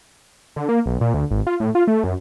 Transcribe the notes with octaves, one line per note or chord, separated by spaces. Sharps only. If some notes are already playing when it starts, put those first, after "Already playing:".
D3
A#3
B1
A#2
D2
G#1
F4
A2
F4
A3
F#2